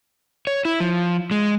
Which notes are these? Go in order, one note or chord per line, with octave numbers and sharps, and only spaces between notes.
C#5
E4
F3
G#3